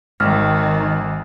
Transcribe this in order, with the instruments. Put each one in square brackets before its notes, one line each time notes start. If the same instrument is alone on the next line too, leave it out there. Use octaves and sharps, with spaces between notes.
[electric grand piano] G#1 [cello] D#3 [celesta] F6